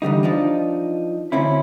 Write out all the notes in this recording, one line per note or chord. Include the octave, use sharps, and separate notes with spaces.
E2 D3 G3 D#4
F3 D4 D#4
D2 C4 C#4 E4